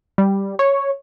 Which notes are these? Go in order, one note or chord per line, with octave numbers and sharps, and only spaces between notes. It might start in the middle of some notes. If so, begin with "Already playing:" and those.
G3
C#5